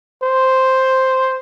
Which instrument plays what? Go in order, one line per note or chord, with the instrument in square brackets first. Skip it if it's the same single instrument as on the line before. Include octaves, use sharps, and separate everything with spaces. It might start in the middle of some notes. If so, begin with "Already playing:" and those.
[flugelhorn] C5